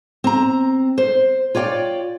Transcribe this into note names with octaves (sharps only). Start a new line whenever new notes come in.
C4 A#5
C5
F4 C#5 D5 G5